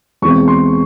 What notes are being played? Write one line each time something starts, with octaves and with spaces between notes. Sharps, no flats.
E2 B2 G#3 C4 C#6
C6